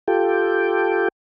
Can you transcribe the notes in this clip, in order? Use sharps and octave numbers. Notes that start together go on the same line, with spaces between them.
F4 G4 A4 G5